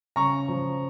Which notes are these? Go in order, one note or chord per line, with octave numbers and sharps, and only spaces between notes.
C#3 A#5 C#6
F3